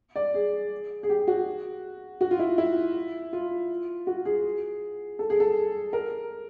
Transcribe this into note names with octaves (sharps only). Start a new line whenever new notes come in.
D5
G#4
G#4
G4
F#4
F#4
F4
E4
E4
F4
F#4
G#4
A4
G#4
A4
A#4